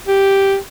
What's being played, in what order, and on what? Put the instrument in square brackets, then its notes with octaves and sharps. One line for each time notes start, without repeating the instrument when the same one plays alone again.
[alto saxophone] G4